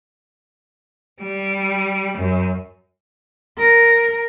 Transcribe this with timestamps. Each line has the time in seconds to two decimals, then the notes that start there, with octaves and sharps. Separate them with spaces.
1.22 G3
2.18 F#2
3.58 A#4